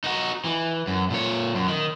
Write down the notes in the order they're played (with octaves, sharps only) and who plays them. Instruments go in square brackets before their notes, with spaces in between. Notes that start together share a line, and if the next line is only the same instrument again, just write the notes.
[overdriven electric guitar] D#4 F#4
E3
F#2
A#2 C#5
F#2
D#3